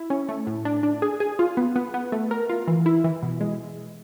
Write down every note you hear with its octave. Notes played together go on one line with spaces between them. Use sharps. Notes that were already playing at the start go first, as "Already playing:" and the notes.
Already playing: E4
C#4
A3
A2
D4
D4
G#4
G#4
F4
B3
B3
B3
A3
A#4
F4
E3
E4
E3
B2
G#3